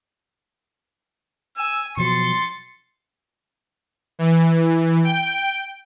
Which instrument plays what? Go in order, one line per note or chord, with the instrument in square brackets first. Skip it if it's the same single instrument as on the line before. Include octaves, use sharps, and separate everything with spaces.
[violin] G#5 [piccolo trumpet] E6
[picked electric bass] B2 F3 F#3 [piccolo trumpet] C6 [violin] A6 C#7
[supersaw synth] E3
G5